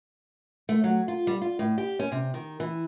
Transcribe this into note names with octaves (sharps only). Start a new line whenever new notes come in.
A3
F#3
F4
G3
F4
A2
G4
C#4
C3
D#3
E3